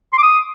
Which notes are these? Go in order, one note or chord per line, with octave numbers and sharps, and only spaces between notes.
C6
D6
D#6